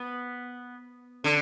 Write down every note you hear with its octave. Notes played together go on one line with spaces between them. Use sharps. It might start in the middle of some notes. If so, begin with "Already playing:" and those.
Already playing: B3
D3